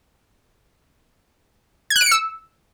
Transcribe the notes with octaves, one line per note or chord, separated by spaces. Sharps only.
G#6
F#6
D7
C#7
E6